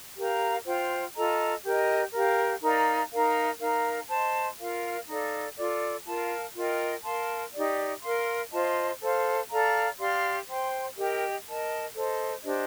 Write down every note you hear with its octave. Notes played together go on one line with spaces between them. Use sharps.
G4 A#4 F5 A#5
F4 C5 G5
F4 A4 D#5 A#5
G4 A#4 D#5
G4 A#4 F5
D#4 A#4 D5 F5
D#4 A#4 F5
D#4 A#4 F5
C5 D#5 A5 C6
F4 A#4 F5
D#4 A4 D5 F5
F4 A4 D5
F4 A#4 F5 A5
F4 A#4 D#5 G5
A#4 F5 A5 C6
D#4 G4 D5
A#4 F5 C6
F4 C5 D#5 A5
A4 C5 F5
A4 D5 F5 A#5
G4 D5 F5 C6
C5 G5 C6
G4 A#4 D#5 G5
A#4 D#5 A5
A4 C5 D#5
D4 G4 C5 D#5